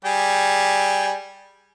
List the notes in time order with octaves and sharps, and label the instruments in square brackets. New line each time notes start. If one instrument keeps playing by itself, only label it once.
[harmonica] G3 G4 G#4